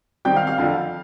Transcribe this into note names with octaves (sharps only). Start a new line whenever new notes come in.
D#3 G3 C4 G5 G6
F5 F6
F5 F6
F2 D3 F3